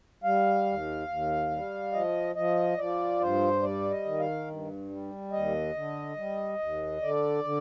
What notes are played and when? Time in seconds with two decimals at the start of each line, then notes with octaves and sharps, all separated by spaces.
0.24 G3 F5
0.66 D#2
1.08 D#2
1.51 G3
1.93 F3 D#5
2.35 F3 D#5
2.78 F3 D5
3.20 G2 C5
3.62 G3 D5
3.91 D#5
4.05 D#3
4.19 F5
4.47 G2
4.90 G3
5.32 D#2 D#5
5.75 D3
6.16 G3
6.59 D#2
7.01 D3 D5
7.44 D3